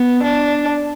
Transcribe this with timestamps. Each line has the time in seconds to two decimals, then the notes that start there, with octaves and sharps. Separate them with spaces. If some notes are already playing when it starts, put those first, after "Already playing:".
Already playing: B3
0.23 D4